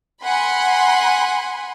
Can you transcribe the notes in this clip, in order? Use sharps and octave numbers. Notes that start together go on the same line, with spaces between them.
F#5 G#5 B5 C6